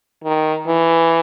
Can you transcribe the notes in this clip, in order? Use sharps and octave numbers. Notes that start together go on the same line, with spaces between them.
D#3
E3